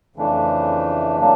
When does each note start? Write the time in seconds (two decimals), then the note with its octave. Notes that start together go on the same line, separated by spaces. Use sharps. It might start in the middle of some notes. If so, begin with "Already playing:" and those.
0.16 F2 C#3 E3 A3 D4
1.19 C#3 F#3 A#3 D4